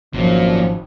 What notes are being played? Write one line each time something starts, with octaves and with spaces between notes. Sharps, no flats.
G#1 F#2 A#2 F3